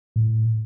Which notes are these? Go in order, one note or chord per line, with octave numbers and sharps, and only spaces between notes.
A2